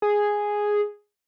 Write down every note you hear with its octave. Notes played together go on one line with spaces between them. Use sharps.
G#4